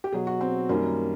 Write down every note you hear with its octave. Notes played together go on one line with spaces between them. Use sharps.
G4
B2 F#3 G#4
F#4
C4
F#2 D#3 G3 A#3